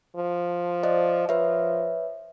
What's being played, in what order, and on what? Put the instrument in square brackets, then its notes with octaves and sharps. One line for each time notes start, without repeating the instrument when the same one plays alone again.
[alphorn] F3
[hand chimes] C5 D5 D#5
[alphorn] F3 [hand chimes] B4 C#5 E5